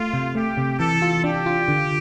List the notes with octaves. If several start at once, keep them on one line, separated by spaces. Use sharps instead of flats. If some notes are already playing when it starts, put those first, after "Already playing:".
Already playing: A3 F4
C3
A3 G4
C3
E3 A4
F4
D4 G4
F4
D3